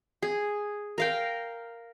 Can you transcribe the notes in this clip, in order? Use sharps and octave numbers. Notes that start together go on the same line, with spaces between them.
G#4
A#4 F5 G5